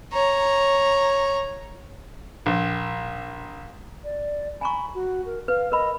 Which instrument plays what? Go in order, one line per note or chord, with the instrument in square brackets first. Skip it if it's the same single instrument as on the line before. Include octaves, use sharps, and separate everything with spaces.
[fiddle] C#5 A#5
[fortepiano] A#1
[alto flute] D5
[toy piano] G#5 A#5 C#6 [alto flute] B5
[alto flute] F#4
A#4
[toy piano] B4 [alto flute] F5
[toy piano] A#4 B5 [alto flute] D#5